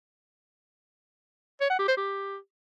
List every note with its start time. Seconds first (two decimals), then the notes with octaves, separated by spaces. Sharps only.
1.61 C#5
1.70 F#5
1.79 G4
1.88 C5
1.97 G4